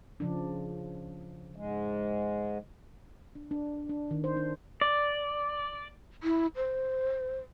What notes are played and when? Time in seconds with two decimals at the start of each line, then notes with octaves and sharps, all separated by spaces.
0.20 C#3 F3 D4
1.56 G#2 G#3
3.35 D4
3.51 D4
3.89 D4
4.11 D#3
4.24 C5
4.36 D4
4.81 D5
6.23 E4
6.56 C5